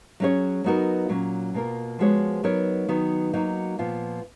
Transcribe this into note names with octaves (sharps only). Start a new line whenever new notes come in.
F#3 C#4 G#4 C#5
F#3 B3 D#4 F#4 A#4
A#2 F#3 C#4
B2 A#3 F4 A#4
F3 G#3 B3 F#4 C#5
F#3 B3 D#4 A#4 C#5
D#3 F#3 B3
F#3 A#3 D#4 F#4
A#2 F3 B3 F4